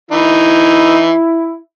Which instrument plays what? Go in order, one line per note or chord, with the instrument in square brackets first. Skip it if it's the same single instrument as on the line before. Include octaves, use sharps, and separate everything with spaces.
[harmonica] E3 D#4 [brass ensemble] E4